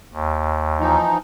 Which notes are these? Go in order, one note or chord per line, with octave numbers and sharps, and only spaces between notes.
D#2
E3 F3 D#4